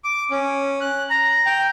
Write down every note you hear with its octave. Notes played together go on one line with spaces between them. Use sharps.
D6
C#4
F#6
A#5
G5